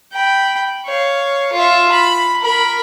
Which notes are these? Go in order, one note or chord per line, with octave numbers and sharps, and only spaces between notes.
G5 B5
C#5 F5
F4 E5
B5
A#4 B5